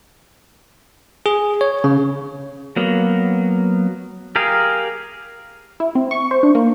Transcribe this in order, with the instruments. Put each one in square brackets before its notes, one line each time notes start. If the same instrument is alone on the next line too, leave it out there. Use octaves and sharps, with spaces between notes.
[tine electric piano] G#4
C#5
C#3
[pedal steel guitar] F#3 A#3 B3
G4 G#4 A#4 F5
[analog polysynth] E4
C4
C#6
C5
D4
A#3